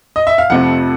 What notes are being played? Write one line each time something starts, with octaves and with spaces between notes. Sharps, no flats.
D#5
E5
F5
F2 C3 F3 A3 F#5